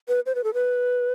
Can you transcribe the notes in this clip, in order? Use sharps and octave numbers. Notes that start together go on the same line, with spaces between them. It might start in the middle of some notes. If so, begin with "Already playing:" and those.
B4
C5
B4
A4
B4